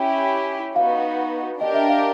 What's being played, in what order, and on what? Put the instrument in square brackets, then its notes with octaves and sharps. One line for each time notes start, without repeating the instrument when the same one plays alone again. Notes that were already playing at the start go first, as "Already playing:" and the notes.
Already playing: [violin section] C#4 E4 G4 [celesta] G5
[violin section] B3 D#4 F#4 [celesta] F5
[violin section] D4 G4 A#4 [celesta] D#5
[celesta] E5
F5